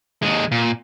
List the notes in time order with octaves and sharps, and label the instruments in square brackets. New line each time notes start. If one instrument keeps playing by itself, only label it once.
[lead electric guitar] D#2 G#3
A#2